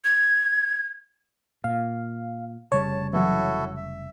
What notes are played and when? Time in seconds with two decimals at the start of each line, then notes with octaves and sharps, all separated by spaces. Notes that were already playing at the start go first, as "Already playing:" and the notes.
0.04 G#6
1.64 A#2 F5
2.72 F1 C#3 G3 C#5 A5
3.13 E3 F#3 E4 F#4 A4
3.77 E5